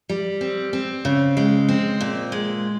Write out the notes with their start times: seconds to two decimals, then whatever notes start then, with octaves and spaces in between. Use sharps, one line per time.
0.09 G3
0.41 C4
0.73 C4
1.05 C#3
1.37 G#3
1.69 C4
2.01 A#2
2.32 G#3